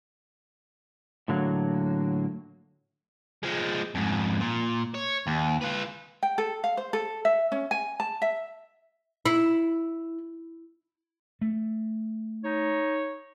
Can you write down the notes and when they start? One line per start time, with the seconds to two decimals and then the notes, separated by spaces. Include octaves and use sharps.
1.28 A2 D3 F#3 A#3
3.43 F3 G#3
3.95 F2 G#2
4.40 A#2
4.94 C#5
5.27 D#2
5.61 F4 B4
6.23 G5
6.38 A4
6.64 F5
6.77 C5
6.93 A4
7.25 E5
7.52 C#4
7.71 G#5
8.00 A5
8.22 E5
9.26 E4
11.41 A3
12.44 D#4 C#5